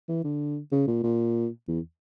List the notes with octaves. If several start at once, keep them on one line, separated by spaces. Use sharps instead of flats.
E3
D3
C#3
A#2
A#2
E2